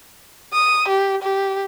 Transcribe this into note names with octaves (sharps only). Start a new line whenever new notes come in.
D#6
G4
G4